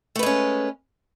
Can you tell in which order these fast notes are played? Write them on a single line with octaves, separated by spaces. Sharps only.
A3 B4 G#3 C#4